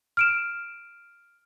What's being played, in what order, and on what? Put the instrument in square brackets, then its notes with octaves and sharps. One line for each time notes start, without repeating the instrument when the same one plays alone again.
[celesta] F6 D7 E7